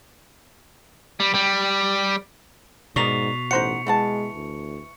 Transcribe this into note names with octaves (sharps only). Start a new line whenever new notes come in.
G3
G3
G#2 B2 D#4 A#4 D5 C#6 F7
A1 D#4 C5 F#5 C#7
E3 G#3 F#5 A5
D2